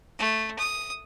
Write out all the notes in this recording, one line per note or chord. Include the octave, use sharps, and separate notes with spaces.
A3
D#6